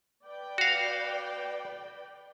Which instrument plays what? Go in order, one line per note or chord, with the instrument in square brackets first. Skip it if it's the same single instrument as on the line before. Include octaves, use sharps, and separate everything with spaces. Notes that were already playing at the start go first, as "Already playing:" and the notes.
[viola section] B4 D5 G5
[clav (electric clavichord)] F#4 F5